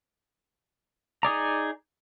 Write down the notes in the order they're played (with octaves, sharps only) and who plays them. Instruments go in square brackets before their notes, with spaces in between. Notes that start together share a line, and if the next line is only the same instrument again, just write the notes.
[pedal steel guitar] D#4 G#4 D5 A#5